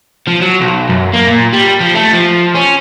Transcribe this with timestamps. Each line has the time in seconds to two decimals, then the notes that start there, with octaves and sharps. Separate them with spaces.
0.28 F3
0.42 F#3
0.61 B1
0.89 F#2
1.13 A#3
1.27 A#2
1.53 G3
1.80 F3
1.94 A3
2.13 F3
2.55 C#4